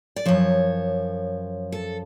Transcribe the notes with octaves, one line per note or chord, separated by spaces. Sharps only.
D5
F#2 F3 C#5
A4